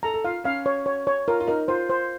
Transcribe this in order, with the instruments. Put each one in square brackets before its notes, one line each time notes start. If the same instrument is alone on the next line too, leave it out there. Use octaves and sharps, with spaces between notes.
[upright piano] A4 [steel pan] A#5
[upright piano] A4
[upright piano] F4 [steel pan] F5
[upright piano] C#4 [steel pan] F5
[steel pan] C#5
C#5
C#5
[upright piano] F4 [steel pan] A#4
[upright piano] F4
[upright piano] D#4 [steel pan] A#4
[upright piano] F4 [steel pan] C5
[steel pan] C5